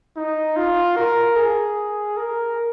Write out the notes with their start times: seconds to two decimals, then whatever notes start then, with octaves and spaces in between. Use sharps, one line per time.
0.16 D#4
0.57 F4
0.96 A#4
1.36 G#4
2.17 A#4